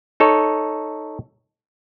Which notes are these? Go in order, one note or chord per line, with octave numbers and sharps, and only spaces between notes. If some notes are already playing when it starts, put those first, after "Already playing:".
D#4 A4 C#5